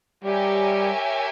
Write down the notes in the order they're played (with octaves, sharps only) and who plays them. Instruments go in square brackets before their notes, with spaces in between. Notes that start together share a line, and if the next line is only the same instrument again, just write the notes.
[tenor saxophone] G3 [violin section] G4 A#4 C#5 E5 G#5